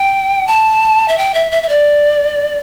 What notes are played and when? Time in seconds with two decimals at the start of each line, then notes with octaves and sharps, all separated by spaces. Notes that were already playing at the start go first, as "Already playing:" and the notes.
Already playing: G5
0.47 A5
1.08 E5
1.18 G5
1.34 E5
1.52 E5
1.63 E5
1.69 D5